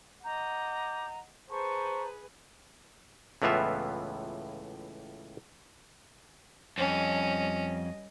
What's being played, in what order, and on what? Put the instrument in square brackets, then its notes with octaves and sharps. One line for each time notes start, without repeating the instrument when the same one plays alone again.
[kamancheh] D#5 F#5 [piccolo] A#5 [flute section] D6 G6
[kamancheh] G#4 B4 [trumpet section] C5 [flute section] A5 A#5 [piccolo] C#6
[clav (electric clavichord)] C#2 A2 E3 B3 F4 E5
[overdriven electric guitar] F2 [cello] G3 D#5 [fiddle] C#4